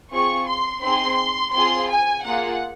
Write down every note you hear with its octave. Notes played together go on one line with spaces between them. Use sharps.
C4 F4 G#4 C#6
C6
C4 D#4 G#4 C6
C4 F4 G#4 C6
G#5
A#3 F4 G#4 F#5